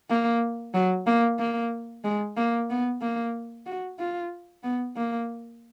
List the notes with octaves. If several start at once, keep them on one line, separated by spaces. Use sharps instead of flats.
A#3
F#3
A#3
A#3
G#3
A#3
B3
A#3
F#4
F4
B3
A#3